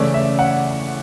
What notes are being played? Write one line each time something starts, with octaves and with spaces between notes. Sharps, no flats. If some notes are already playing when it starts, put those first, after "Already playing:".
Already playing: C#3 E3 A3 C#4 E4 D5
E5
F#5